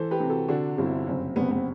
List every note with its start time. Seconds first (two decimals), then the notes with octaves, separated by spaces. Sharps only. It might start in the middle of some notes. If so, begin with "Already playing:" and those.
Already playing: E3 A4 C5
0.11 G4 B4
0.20 C3
0.29 F#4 A4
0.49 D3 D4 F#4
0.78 G1 C4 E4
1.07 F#1 C4
1.36 F#1 B3
1.43 C4
1.51 B3